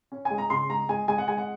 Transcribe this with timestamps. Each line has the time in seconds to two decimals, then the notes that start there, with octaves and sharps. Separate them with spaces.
0.12 C#4
0.25 G#5
0.30 G#3
0.38 A#5
0.50 C#3 C6
0.69 G#3 A#5
0.89 G#3 G#5
1.08 G#3 G#5
1.18 F#5
1.28 G#3 G#5
1.38 F#5